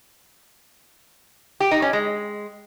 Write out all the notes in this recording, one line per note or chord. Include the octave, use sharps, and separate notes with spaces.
G4
D#4
C#4
G#3